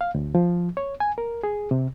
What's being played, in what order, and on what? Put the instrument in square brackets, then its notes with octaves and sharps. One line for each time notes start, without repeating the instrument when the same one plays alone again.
[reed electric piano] F5
D2
F3
C#5
G#5
A#4
G#4
C3